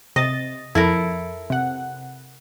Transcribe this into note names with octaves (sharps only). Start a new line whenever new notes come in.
C3 D#5 A6
F2 E4 A4 A#4
C3 F#5